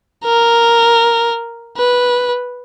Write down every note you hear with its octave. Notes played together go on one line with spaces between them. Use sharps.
A#4
B4